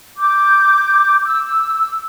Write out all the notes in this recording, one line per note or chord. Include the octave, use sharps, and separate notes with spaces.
D6 G6
E6